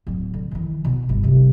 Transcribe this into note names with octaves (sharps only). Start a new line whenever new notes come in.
D1 F#3
D3
D#3 E3
B2 D#3
G1
C3 G3